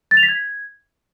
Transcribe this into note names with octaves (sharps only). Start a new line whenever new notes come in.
A6
F7
B6
G#6